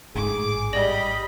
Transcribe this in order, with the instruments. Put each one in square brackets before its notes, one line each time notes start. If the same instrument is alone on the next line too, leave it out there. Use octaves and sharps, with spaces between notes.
[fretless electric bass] A1 G#2 [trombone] G#4 [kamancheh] D6
[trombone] G3 [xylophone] D5 A#6 F#7 [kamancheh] D#5 B5